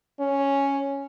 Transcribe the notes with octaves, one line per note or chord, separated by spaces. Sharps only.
C#4